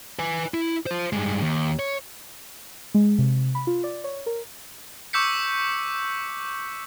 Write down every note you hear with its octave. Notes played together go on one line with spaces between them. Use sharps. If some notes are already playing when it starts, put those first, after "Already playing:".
B4 G#5
E4
F4 C5
G2 G#3
D#2
C#5
G#3
C3
B5
F4
D5
C#5
A#4
C#6 D6 E6 G6 B6 C#7